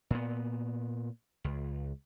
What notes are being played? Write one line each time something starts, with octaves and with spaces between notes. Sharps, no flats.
A#2 B3
C#2